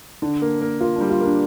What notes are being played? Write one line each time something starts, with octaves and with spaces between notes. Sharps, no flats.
D3 D4
A#3
A#3
A#3 F4
D4
G3
F4
A#3 D4